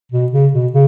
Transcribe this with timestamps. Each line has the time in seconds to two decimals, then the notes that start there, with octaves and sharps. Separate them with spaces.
0.12 B2
0.32 C#3
0.53 B2
0.72 C#3